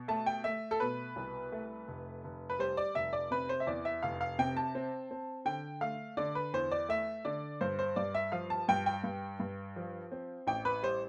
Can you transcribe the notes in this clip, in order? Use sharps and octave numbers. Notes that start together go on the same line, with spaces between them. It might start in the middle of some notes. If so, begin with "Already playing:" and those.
Already playing: B2
A3 A5
G5
A3 E5
A4
B2 B4
C2
A3
F1
F1
B4
G3 C5
D5
F1 E5
D5
C3 B4
C5
E5
E2 D5
E5
F1 F5
F5
C3 G5
A5
C4
C4
D3 G5
A3 F5
D3 D5
B4
E2 C5
D5
A3 E5
D3 D5
G2 C5
C5
G2 D5
E5
F3 F5
A5
G2 G5
G5
G2
G2
F3
C4
A1 G5
B4
G3 C5